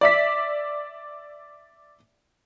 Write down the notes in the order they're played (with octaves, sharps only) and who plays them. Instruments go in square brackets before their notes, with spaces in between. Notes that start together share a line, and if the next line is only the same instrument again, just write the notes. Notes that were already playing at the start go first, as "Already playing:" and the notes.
[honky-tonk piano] D5 E5 B6